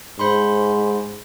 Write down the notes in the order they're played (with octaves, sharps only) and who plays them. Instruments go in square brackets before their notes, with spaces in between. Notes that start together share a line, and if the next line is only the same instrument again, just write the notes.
[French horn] G#2 [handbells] C5 B5 C6